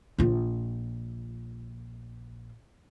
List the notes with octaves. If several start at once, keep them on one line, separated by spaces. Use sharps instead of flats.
A#1 F4